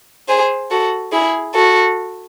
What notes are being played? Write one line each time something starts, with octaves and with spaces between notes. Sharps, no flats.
G#4 C5
F#4 A4
E4 G#4
F#4 A4